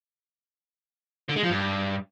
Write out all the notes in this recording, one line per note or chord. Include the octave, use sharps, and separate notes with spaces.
D3
G#3
F3
G2